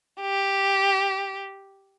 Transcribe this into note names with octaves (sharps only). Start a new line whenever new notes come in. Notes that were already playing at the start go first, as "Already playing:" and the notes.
G4